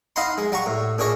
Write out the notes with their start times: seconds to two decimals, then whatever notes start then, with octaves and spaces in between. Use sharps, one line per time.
0.16 D#4 D#5 F5 F#5 B5 C6
0.38 G#3
0.52 G3 F#5 A#5 C#6
0.66 A2
0.98 A#2 D4 G#4 C#5 D#5